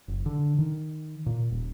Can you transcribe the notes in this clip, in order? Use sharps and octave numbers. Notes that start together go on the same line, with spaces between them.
F#1
D3
D#3
A#2
D#1